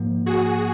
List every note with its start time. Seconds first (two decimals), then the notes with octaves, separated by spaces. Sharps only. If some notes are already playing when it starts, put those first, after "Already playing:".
Already playing: G#2 F3 A#3
0.26 F#4 G#4